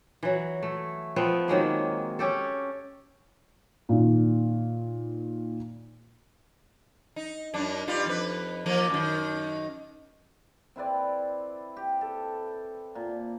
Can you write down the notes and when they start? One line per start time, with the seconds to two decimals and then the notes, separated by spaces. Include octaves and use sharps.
0.23 E3 F#3
0.63 A3
1.16 F3 B3 C4
1.48 D#3 F#3 G#3 A#3
2.19 C#4 G4 A4
3.89 A#2 D#3
7.16 D#4
7.54 F#2 D4 D#4
7.88 G2 G3 F4
8.06 F2 B4
8.66 F3 A#3 A#4
8.89 F#2 D#3
10.76 C4 E4 B4 D5
11.77 G4
12.01 A4
12.95 A#2